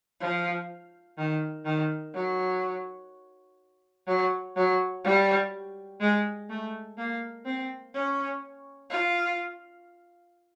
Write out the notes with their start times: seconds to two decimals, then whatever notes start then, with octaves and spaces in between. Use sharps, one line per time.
0.20 F3
1.18 D#3
1.65 D#3
2.14 F#3
4.07 F#3
4.56 F#3
5.04 G3
6.01 G#3
6.50 A3
6.98 A#3
7.45 C4
7.94 C#4
8.90 F4